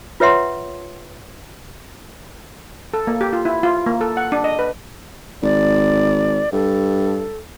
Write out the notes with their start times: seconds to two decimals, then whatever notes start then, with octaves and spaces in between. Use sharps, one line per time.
0.20 F4 B4 C#5 E5 F#5 C6
2.94 A4
3.07 A#3
3.21 G4
3.33 F4
3.45 E4
3.63 F4
3.86 A#3
4.01 A4
4.17 F#5
4.32 D4
4.44 D#5
4.59 B4
5.43 G#1 D5
6.53 G2 A4